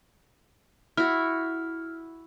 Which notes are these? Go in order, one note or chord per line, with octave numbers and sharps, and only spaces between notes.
E4 F#4 F6